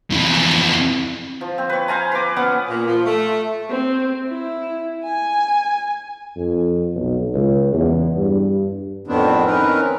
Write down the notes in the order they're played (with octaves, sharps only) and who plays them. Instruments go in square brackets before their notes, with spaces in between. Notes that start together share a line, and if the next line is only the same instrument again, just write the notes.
[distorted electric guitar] F2 E3
[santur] F3
C4
B4 C#5
C5 F5 G#5 A#5
B4 D6
B3 C#4 F#5 D6
[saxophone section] A#2
F3
A3
[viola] C4
E4
G#5
[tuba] F2
B1
C#2
E2
G2
[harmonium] F2 A2 D#3 B3 C4 D4
C4 C#4 D#4 A#4 B4